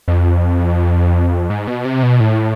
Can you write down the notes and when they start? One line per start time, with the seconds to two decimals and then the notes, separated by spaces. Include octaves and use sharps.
0.08 F2
1.50 G#2
1.67 B2
1.85 C3
2.03 B2
2.20 A2